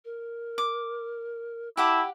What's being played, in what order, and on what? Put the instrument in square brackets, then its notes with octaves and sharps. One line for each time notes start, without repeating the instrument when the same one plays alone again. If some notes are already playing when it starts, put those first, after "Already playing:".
[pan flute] A#4
[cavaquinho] D6
[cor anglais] E4 [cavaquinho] G4 F#5 D6 [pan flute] A5